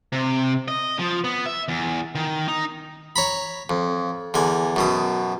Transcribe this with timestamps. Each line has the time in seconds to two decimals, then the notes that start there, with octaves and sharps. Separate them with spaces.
0.12 C3
0.68 D#5
0.99 F3
1.24 B3
1.46 E5
1.68 E2
2.15 D#3
2.48 D#4
3.16 C#5 A#5 B5
3.70 F2
4.34 E2 D3 G#5
4.76 F#2 B2 D#6